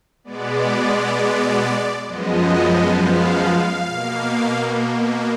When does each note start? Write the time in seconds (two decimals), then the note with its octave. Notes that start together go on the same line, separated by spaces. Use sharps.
0.24 B2 G#3 B3 D5
2.05 F#2 F3 G#3 B3 D#5
2.96 F5
3.86 B2 A#3